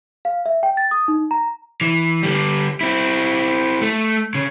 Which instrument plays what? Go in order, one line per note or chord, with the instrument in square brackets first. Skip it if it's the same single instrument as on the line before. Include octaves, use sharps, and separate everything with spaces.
[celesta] F5
E5
G5
A6
D#6
D#4
A#5
[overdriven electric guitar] E3
D3 G3
C4 E4
A3
C#3